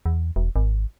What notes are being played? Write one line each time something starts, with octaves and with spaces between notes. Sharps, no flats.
E2
E1
G#1